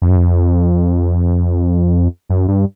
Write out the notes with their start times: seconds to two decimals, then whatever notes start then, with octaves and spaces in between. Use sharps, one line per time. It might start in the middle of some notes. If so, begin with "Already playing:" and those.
0.02 F2
0.09 F#2
0.16 F2
2.29 F#2
2.48 G2